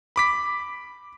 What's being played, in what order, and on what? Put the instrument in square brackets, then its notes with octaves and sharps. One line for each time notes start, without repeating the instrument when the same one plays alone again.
[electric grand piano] B5 D6 B6